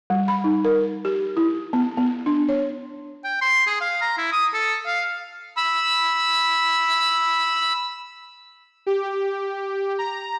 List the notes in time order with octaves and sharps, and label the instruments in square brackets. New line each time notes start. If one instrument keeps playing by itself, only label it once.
[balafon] G3
B5
D#4
A#4
G4
E4
B3
B3
D4
C#5
[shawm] G5
C6
G#4
F5
A#5
E4
D#6
A4
F5
[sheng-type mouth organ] B5 E6
[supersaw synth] G4
A#5